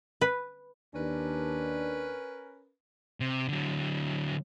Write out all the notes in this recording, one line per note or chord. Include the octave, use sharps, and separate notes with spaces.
B4
D#2 C#4 D4 A#4 B4
C3
D3 F#3